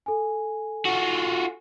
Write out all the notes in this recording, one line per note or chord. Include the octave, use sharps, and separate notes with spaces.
A4 G#5
F4 F#4